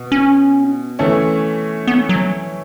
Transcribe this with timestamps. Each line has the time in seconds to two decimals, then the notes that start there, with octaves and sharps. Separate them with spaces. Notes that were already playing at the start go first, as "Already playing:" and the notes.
Already playing: B2
0.12 C#4
0.99 E3 A3 C#4
1.87 B3
2.09 F#3